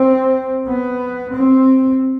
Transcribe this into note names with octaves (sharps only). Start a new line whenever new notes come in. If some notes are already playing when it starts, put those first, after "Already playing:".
Already playing: C4
B3
C4